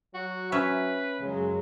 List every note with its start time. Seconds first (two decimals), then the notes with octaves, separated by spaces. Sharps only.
0.14 F#3 F#4
0.52 C#4 B4 E5
1.20 F#2 C#3 F#3 G#3